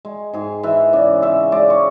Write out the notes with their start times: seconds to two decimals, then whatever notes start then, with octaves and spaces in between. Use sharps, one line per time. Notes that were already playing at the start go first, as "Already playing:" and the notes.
0.05 G#3
0.33 G#2 G#4
0.63 E3 E5
0.93 C#3 D5
1.22 C#3 E5
1.52 G#3 D5
1.70 C#5